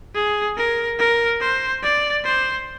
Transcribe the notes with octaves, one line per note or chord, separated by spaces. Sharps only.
G#4
A#4
A#4
C5
D5
C5